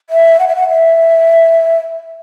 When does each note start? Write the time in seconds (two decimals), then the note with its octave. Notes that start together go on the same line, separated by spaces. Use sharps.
0.10 E5
0.39 F#5
0.47 E5
0.56 F#5
0.69 E5